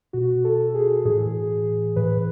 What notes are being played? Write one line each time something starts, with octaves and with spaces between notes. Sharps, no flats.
B2 F#4
A4
G#4
A2 E3 G#4
A2 E3 B4